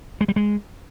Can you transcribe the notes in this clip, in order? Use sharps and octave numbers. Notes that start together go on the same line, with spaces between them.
G#3
G3
G#3